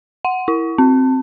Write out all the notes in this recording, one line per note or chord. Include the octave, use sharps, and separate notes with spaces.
F#5
E4
C4